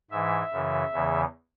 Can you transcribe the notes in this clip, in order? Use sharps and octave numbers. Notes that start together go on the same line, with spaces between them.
G#2 E3 E5
F#2 C#3 E3
E2 C#3 E3